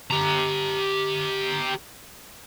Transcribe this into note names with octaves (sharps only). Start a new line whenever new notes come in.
G4 A#5